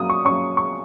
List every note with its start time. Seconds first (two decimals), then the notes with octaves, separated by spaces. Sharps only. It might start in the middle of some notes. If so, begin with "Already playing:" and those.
Already playing: F#3 A#3 C#4 D#6
0.10 C#6
0.25 F#3 A#3 C#4 C#6
0.57 C#6